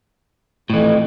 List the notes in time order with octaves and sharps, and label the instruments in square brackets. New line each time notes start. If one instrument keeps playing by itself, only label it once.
[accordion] F2 [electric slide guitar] A2 E3